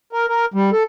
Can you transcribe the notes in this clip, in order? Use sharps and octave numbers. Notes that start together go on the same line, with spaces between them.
A#4
A#4
G3
A4